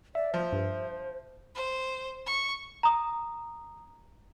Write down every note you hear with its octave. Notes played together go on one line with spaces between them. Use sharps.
D5 E5
F3 C5
G2
C5
C#6
A#5 D#6